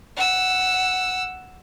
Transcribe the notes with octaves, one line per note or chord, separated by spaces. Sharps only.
F#5 E6